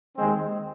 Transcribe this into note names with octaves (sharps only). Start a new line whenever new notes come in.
D#2 D#3 G#3 C4